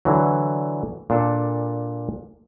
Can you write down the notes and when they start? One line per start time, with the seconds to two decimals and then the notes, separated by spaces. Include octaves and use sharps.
0.05 D3 E3 F#3
1.10 A#2 D4 A4